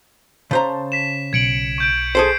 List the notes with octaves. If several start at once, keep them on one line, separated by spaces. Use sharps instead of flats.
C#3 C5 A5 A#5
B6 E7
B1 G#6 C#7 D7 F#7
C#6 G6 D7
G#4 A4 C5 C7